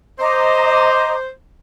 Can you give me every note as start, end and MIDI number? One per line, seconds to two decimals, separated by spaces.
0.19 1.28 72
0.19 1.14 75
0.19 1.14 82
0.19 1.14 86